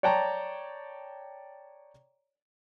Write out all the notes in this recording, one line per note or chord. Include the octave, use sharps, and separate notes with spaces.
C#5 D5 G5 A5 A#5